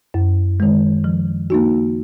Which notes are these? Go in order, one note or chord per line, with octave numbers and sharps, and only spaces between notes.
F#2
D#3 G#3
F3
A#3 D#4 F#4